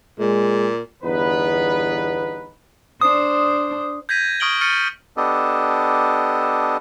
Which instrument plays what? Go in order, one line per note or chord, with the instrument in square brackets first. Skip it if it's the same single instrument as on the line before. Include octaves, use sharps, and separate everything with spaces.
[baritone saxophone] A#2 [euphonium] G#3
[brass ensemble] G1 E2 B3 D#4 B4
[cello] D4 C5 [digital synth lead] D#6
[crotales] G6 G#6 A#6 B6 D#7
C#6 D#6 F6 D7 F#7 G7
C#6 F6 A6 C#7 D#7
[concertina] B3 D4 G4 A4 D#5